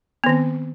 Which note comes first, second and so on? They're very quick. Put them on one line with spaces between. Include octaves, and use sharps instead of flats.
B3 D#3 C4